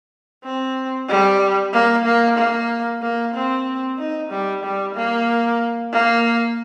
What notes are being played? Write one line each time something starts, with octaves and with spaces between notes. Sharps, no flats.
C4
G3
A#3
A#3
A#3
A#3
C4
D#4
G3
G3
A#3
A#3